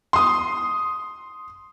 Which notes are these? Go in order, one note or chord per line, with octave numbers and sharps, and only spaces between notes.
C6 D#6